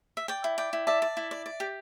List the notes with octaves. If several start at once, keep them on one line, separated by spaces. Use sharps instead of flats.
E5
D5 G5
E4
D5 G5
E4
D5 E5 A5
D5
E4
D5
D5
G4